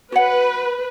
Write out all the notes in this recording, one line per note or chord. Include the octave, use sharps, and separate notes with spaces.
F#4 B4 C#5 F#5